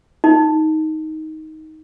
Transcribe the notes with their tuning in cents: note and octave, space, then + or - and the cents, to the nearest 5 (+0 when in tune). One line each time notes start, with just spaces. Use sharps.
D#4 +10